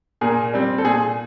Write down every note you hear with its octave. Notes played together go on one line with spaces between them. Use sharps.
A#2 G#4 A#4
G3 C4
A4
A#2 G#4